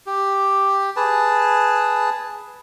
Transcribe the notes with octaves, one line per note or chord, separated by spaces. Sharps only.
G4
G#4 B4 A5